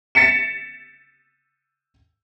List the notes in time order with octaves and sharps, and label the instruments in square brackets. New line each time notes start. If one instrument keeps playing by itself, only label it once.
[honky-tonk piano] A6 B6 C#7 E7